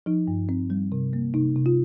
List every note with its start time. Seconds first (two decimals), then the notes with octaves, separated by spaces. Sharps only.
0.06 F3 D#4
0.28 G2
0.49 C4
0.70 G3
0.92 C3
1.13 A#3
1.34 C3 D#4
1.56 C3
1.66 F4